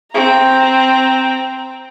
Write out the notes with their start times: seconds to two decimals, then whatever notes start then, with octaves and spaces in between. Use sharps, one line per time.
0.12 C4 A#5